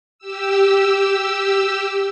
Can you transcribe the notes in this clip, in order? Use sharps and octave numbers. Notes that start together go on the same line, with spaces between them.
G4 E6